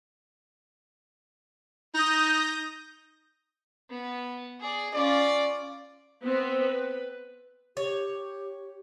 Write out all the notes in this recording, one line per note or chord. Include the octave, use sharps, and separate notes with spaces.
D#4 D#6 G6 A#6
B3
G#4 D5
C#4 F4 D5
B3 C4 B4
B4
G4 C#5